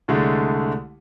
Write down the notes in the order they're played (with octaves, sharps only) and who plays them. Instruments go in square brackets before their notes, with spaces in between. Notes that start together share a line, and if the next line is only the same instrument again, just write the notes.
[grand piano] C2 D3 G#3 A3